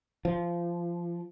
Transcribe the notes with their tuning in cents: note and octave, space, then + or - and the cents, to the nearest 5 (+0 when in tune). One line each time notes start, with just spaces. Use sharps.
F3 -20